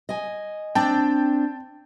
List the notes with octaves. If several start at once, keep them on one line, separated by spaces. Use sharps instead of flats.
D#5 G#5
C4 D4 G5 A5